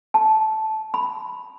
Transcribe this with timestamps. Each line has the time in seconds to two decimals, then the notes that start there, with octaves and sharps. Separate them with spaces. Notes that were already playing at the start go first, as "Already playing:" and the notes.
0.14 A5
0.94 B5